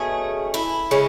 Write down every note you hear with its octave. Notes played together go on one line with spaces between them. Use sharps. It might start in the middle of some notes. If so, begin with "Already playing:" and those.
Already playing: B2 A3 C#4 G#4
E4
C#3 G#3 C#4